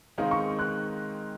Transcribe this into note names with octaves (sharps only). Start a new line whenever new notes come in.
D#3 G#3 C4 D#4 A#4 F5
C#6
F#6